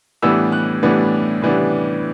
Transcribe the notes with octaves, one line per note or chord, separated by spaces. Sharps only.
A2 E3 G3 B3 D4 E6
F#6
A2 E3 G3 B3 D4
A2 E3 G3 B3 D4